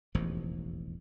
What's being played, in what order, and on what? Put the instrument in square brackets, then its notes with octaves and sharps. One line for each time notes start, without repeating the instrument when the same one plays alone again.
[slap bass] E1 A1 D#2 F3